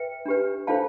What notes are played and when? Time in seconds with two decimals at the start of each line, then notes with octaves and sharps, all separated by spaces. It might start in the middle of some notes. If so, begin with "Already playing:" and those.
Already playing: B4 E5 G5
0.26 D4 G4 B4
0.67 D4 F4 A4 C5 F5 A5